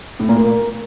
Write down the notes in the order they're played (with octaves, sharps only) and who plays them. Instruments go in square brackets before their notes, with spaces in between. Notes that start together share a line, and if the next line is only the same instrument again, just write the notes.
[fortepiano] A2
A#2
A#3